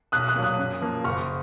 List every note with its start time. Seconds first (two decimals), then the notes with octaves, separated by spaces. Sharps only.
0.12 B1 D#6 F#6
0.28 D#6 F#6
0.35 A#2 F#3
0.43 D#6 F#6
0.58 F#2
0.81 F3 A#3
1.04 F#1 C#6 F6